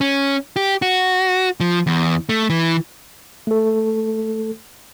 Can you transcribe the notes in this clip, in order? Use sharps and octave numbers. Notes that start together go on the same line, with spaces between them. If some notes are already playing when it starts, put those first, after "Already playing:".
C#4
G4
F#4
F3
E2
A3
E3
A3 A4